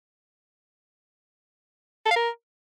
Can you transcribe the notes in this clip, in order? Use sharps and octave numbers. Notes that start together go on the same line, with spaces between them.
A4
F5
A#4